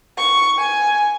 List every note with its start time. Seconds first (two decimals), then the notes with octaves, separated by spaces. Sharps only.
0.18 C#6
0.59 G#5